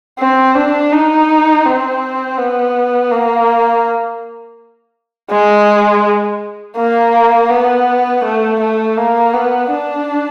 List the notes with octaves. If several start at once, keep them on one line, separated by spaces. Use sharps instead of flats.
C4
D4
D#4
C4
B3
A#3
G#3
A#3
B3
A3
A3
A#3
B3
D4